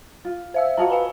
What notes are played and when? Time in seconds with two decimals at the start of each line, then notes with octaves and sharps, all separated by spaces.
0.25 F4
0.54 C5 E5 F5 E6
0.77 F4 F#4 D#5 F5 A5 A#5
0.90 B4 F5 G#5 B5